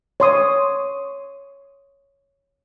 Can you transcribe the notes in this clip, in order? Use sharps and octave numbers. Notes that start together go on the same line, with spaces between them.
C#5 C6 D#6